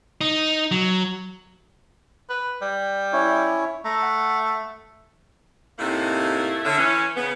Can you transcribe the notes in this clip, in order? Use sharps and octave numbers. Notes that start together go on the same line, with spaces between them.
D#4
F#3
B4
G3
C#4 E4 C#5
A3 A#5
F#5
A2 C3 A3 A#3 D#4 E4
D3 C#4 E5
E3 C#4
C#3 B3